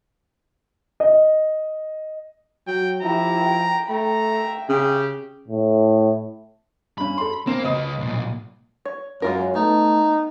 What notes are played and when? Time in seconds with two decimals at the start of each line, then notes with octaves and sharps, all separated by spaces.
1.00 D#5
2.67 F#3 G5
3.02 F3 E4 G4 A#5
3.45 G5
3.89 A3 A#5
4.23 E5 G5
4.69 C#3 G4
5.48 A2
6.98 G2 C#4 B5
7.18 A4 C6
7.47 A#3 C4 E7
7.64 C#2 B4 D#5 D#6
7.99 B1 A#2
8.85 C#5
9.22 F#2 G#3 F4 A#4 C#5
9.55 A3 B3 D#4